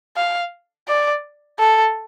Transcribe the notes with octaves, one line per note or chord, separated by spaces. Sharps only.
F5
D5
A4